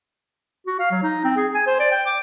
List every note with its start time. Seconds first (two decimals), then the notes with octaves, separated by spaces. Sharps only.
0.67 F#4
0.79 F5
0.91 F#3
1.03 D#4
1.24 C4
1.37 G#4
1.54 G#5
1.67 C5
1.80 D5
1.91 G5
2.06 D6